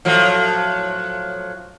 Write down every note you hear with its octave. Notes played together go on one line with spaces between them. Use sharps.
A2 F3 F#3